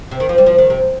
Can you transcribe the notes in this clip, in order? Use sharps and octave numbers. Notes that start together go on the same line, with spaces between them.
C3
D#3
F3
G3
F3
D#3
C3